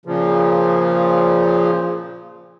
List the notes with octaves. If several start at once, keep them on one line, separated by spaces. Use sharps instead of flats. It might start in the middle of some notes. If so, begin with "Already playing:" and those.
A#2 C#3 F3